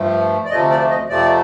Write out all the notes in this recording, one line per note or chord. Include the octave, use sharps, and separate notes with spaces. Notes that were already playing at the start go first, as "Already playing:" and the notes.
Already playing: G2 F3 A3
D5
D2 C3 F3 A3 D#5
D5
D#5
F2 C3 F3 A3 D5